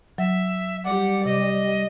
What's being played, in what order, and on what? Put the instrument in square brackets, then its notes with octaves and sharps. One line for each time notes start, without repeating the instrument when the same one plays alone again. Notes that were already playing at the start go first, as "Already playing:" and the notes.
[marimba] F#3 [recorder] E5
[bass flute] G3 [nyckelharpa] G4 D5 [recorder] F#5
[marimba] C3 [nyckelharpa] G4 [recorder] D#5